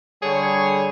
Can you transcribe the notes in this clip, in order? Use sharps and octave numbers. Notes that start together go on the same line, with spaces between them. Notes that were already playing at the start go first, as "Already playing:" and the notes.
D3 G3 G#4 C#5